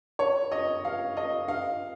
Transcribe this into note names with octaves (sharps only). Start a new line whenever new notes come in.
C#5
D#5
F5
D#5
F5